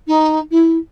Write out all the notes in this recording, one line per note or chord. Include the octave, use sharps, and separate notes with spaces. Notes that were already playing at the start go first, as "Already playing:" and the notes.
D#4
E4